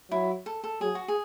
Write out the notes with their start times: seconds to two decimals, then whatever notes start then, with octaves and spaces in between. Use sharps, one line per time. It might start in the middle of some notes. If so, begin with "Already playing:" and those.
0.11 F#3 E4
0.46 A4
0.64 A4
0.81 F#3 G#4
0.95 F#4
1.08 G#4